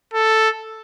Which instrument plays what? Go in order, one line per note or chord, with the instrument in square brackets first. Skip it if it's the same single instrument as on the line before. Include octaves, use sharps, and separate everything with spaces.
[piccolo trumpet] A4